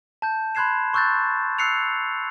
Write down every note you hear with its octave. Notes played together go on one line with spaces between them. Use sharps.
A5 G6
B5 C6 F#6 G#6 C7 E7
C6 C#6 E6 F#6 G6 A6
E6 F#6 C7 C#7 F7